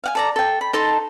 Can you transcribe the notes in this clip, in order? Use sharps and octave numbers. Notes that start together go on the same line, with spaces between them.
F5 F#5 G#5
A4 D5 A#5
A4 G5
B5
D#4 A4 A5 C6